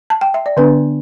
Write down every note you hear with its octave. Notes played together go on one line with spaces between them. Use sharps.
A5
G5
E5
D5
D3 B3 D4 B4